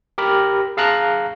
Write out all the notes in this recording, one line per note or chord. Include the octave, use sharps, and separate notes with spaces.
G4 A#4 B5
G#4 F5 A5 A#5 F#6